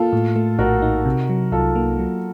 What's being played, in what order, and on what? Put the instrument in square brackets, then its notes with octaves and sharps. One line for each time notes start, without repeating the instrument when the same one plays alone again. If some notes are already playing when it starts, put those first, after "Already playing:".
Already playing: [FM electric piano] A#3 [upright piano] F4 A4
[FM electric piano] A2
A3
[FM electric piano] A#1 [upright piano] F#4 A#4
[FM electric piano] D#4
C3
F#3
[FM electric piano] C2 [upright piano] F4 A4
[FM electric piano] A#3
F#3